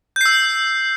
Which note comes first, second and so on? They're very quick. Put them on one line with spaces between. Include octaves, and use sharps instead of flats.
G6 C7 E6